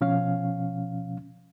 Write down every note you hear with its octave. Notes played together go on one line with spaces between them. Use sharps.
B2 F3 C#4 F5